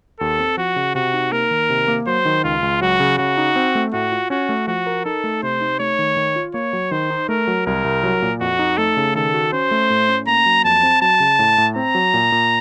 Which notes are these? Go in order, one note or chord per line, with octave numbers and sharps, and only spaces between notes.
D#2 A4
C4
F3 F#4
C#3
C3 F#4
D#4
A#3 A#4
D#3
C3
A#3
F#3 C5
D#3
C#2 F4
C#2
F#3 F#4
C#3
C#3 F#4
D#4
C4
A3
A2 F#4
F4
C#4 F#4
A3
F3 F#4
A#4
D#4 A4
A3
C3 C5
D#4
A3 C#5
D#3
D#3
F4
A#3 C#5
F#3
D#3 C5
D#4
A3 A#4
F#3
C2 A#4
C2
F#3
A#2
F2 F#4
D#4
A3 A4
C#3
D#3 A4
F#4
C#4 C5
A3
A2
C#4
A#3 A#5
F#3
F2 A5
C4
F#3 A5
C#3
A2
A2
C4 A#5
F#3
A#2
A#2